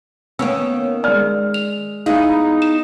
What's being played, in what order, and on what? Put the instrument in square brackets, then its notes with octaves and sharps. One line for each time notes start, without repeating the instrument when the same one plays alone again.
[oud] D#3 A#3 C#4 [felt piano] B3 E6
[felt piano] G#3 F6 [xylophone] D5
[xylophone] F7
[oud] B3 E4 G#4 [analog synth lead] D#4 [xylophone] F5
[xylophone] E7